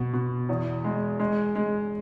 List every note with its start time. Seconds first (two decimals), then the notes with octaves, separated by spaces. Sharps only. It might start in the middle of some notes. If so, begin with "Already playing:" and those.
Already playing: B2
0.13 B2
0.49 E2
0.84 G#3
1.20 G#3
1.55 G#3